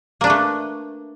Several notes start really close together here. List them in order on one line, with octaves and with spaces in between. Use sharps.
A#3 D4 B4 A3